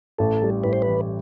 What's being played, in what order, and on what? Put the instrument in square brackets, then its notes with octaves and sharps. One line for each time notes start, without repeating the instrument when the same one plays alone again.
[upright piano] A1 [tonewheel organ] A4
[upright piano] G3
[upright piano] A2 [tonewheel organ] B4
[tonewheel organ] C5
B4
[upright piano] E3